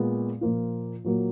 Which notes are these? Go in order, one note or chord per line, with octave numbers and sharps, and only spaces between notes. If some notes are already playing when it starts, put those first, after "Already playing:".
Already playing: A#2 G#3 B3
A#2 F3 A#3 F4
A#2 F#3 A#3